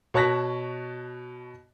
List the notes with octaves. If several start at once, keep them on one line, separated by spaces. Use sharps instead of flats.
B2 C#5 A5 F#6 A#6 B6